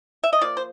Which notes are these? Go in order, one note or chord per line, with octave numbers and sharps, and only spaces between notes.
E5
D#5
F3 A#3 D5
C5